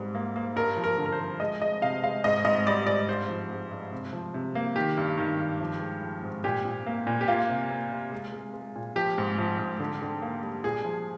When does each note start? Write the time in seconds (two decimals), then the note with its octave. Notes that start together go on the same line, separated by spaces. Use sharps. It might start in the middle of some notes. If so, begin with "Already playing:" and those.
Already playing: G#2 G3
0.15 A#3
0.36 A#3
0.56 G2 A#4
0.77 F3
0.84 A#4
0.98 D3
1.06 A#4
1.13 C5
1.20 F3
1.40 G#3 D#5
1.61 G#3 D#5
1.82 C3 F5
2.03 G#3 F5
2.24 G#2 D#5
2.45 G#2 D#5
2.66 G3 D5
2.87 G#2 D5
3.08 G2 C5
3.29 F3
3.51 G#3
3.71 G2
3.92 C3
4.13 F3
4.34 C3
4.55 A#3
4.76 D#3 G4
4.97 G2
5.18 D#3
5.39 G2
5.60 F3
5.81 G#3
6.02 F3
6.23 G#2
6.44 A#2 G4
6.65 A#2
6.86 A#3
7.07 A#2
7.21 G4
7.28 A#3 F4
7.49 C3
7.70 A#3
7.92 C3
8.12 G#3
8.33 G#3
8.54 G#3
8.76 A#2
8.96 F3 G4
9.18 G#2
9.38 F3
9.59 G#2
9.80 D3
10.02 D3
10.22 A#3
10.43 G3
10.64 A#2 G#4
10.85 F3